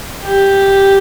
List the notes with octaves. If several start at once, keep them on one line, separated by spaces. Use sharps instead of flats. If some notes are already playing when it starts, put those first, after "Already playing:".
G4